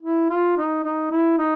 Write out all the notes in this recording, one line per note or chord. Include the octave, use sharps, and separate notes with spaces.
E4
F4
D#4
D#4
E4
D#4